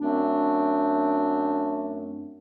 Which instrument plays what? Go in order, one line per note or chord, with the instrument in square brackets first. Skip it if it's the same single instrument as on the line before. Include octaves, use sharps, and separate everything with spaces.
[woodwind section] F#2 A3 C4 D4